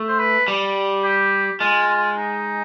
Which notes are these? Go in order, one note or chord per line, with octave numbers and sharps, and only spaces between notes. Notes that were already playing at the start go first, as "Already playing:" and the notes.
Already playing: A3
C5
B4
G3
G4
G#3 F4
D#4